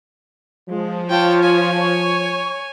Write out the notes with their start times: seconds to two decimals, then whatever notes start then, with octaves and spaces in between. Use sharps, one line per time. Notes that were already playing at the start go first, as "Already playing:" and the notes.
0.69 F3 G#3
1.09 F4 C#5 G5 A5
1.43 G#5
1.79 C#5 C#6